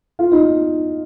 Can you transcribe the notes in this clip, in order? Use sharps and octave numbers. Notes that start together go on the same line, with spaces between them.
F4 F5
D#4 D#5